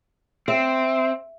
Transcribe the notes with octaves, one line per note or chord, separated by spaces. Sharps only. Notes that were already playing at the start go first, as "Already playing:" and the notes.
C4 E5